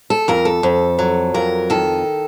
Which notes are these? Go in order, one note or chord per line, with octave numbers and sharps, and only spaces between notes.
A4
F2 A#4
A4
F2
F#3
F2 A#4
D#3 A4